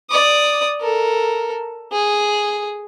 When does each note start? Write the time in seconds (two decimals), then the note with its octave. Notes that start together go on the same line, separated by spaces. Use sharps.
0.10 D5 D#6
0.81 A4 A#4
1.92 G#4